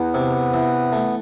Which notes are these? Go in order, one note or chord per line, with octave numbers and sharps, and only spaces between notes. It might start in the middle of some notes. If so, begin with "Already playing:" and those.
Already playing: E2 B3
C3
E3
A3